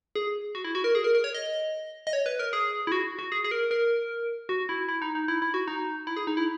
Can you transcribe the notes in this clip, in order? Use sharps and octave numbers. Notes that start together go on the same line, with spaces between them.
G#4
F#4
E4
F#4
A#4
G#4
A#4
A#4
C#5
D#5
D#5
C#5
B4
A#4
G#4
E4
F#4
F#4
G#4
G#4
A#4
A#4
F#4
E4
E4
D#4
D#4
E4
E4
F#4
D#4
E4
G#4
D#4
E4